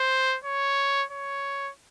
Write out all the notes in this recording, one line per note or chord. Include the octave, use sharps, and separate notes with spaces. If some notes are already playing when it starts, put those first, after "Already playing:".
Already playing: C5
C#5
C#5